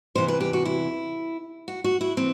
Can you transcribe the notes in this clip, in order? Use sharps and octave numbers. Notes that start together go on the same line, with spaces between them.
E2 C3 E3 C5
B4
G4
F#4
E4
F#4
F#4
E4
E3 C4